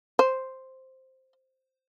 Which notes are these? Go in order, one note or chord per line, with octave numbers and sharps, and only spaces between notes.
C5